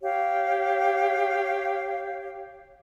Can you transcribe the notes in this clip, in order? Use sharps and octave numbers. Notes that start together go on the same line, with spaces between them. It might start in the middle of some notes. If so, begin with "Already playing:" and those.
G4 C#5 F5